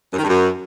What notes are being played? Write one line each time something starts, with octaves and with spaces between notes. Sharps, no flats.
F#2
D#3
G2
F#2